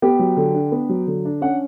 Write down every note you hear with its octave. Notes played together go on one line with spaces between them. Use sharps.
B3 G4
F#3
D3
D4
B3
F#3
D3
D4
C#4 F#5